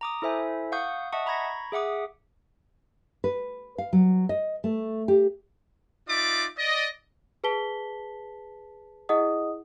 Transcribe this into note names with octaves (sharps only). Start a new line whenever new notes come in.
A#5 D6 D#6
E4 A4 C5 E5 G#5
F5 F#5 C#6 D#6 G6
D#5 E5 F#5 A5 C#6 D#6
A#5 B5 C#6 G#6 A#6
G#4 E5 F#5 D6 D#6
B4
F5
F#3
D#5
A3
G4
D#4 F4 D5 E5 D6
D5 D#5
G#4 B4 A5 B6 G7
E4 G#4 D#5 F#5 D#6